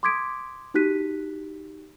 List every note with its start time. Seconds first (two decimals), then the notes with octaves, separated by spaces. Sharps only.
0.03 C6 D6 D#6 G#6 B6 D7
0.74 D#4 F#4 G4 F#6 B6 D#7